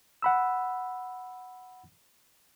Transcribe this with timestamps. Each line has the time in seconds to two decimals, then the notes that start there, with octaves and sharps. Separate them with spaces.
0.22 F#5 B5 E6